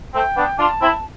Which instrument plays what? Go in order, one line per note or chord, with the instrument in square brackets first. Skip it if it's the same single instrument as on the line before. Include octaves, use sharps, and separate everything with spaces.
[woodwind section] A3 C4 [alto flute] G5
[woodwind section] B3 D4
[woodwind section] D4 F4 [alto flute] A5
[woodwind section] C4 E4